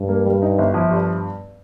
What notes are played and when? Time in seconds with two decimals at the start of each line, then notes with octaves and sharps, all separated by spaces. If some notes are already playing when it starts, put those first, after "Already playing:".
Already playing: G2
0.09 A#3
0.26 G3
0.42 D#4
0.59 G1
0.74 F3
0.91 G2